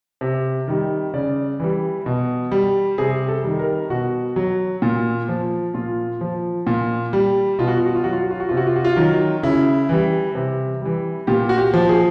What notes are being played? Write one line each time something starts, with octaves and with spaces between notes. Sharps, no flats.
C3
D#3 G3
C#3 D5
E3 G3
B2
G3
C3 G#4
A4
D#3 G3
A#4
B2 F#4
F#3
A#2
F3
A#2 F4
F3
A#2
G3
B2 F4
F#4
F4
F#4
F4
F#3 F#4
F4
F#4
F4
F#4
C3 F4
F#4
F4
F#4
F4
D#3 F#3
C#3 E4
E3 G3
C3
E3 G3
A#2 G4
F#4
G4
F3
G#4